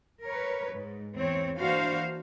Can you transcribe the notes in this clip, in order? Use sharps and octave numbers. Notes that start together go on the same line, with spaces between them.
A#4 B4 C#5
G#2
E2 C4 C#5
E3 A#3 D4 F#4 C5 F5